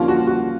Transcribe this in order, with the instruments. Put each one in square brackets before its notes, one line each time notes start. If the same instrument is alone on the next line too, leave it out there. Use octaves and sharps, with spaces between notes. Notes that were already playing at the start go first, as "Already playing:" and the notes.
Already playing: [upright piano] D#2 D3 F3 A#3 C#4 F4
F#4
F#4